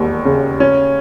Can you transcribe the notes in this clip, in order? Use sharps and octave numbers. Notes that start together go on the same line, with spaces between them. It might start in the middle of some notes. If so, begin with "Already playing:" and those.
Already playing: E1 D#2
C#3
C#4